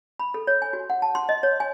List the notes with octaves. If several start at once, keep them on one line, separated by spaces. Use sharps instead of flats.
B5
A4
C#5
G#5
F#4
F#5
A5
C6
D#5
C#5
G#5